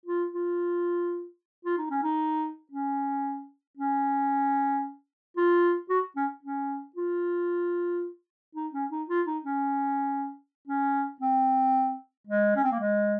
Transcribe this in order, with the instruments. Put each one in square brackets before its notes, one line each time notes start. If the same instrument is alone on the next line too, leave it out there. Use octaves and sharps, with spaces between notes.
[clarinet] F4
F4
F4
D#4
C#4
D#4
C#4
C#4
F4
F#4
C#4
C#4
F4
D#4
C#4
D#4
F4
D#4
C#4
C#4
C4
G#3
C#4
C4
A#3
G#3